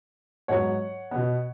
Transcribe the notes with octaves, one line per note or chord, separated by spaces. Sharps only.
G#2 F#3 B3 C#5 F#5
B2 B3